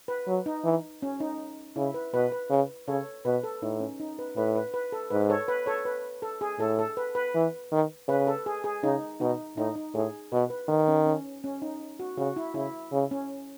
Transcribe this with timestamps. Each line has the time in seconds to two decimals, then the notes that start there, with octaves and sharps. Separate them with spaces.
0.08 B4
0.27 F#3
0.46 D#4
0.64 E3
1.02 C#4
1.20 D#4
1.76 C#3 E4
1.94 B4
2.14 B2 B4
2.32 B4
2.50 C#3
2.88 C#3 A4 C#5
3.25 B2 B4
3.43 A4
3.62 A2 D#4
3.80 C#4
4.00 D#4
4.19 B4
4.37 A2 B4
4.55 B4
4.74 B4
4.92 A4
5.11 G#2 B4
5.30 A4 C#5
5.48 B4
5.66 A4 C#5
5.85 B4
6.22 A4
6.41 G#4
6.59 A2 A4
6.79 A4
6.97 B4
7.15 B4
7.35 E3
7.72 D#3
8.08 C#3 B4
8.27 A4
8.46 G#4
8.64 G#4
8.83 C#3 D#4
9.20 B2 D#4
9.57 A2 D#4
9.76 D#4
9.94 A2 G#4
10.32 B2 B4
10.50 B4
10.68 D#3 D#4
10.88 C#4
11.07 C#4
11.44 C#4
11.62 D#4
11.99 F#4
12.18 C#3 F#4
12.36 E4
12.54 C#3 E4
12.92 C#3
13.11 C#4